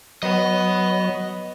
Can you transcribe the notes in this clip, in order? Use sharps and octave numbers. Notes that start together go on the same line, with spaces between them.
F#3 B3 D#5